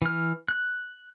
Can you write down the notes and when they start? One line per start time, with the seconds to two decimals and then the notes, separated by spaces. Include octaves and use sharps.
0.02 E3 F6
0.48 F#6